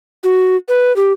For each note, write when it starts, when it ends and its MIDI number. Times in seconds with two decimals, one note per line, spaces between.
0.24 0.56 66
0.69 0.94 71
0.96 1.12 67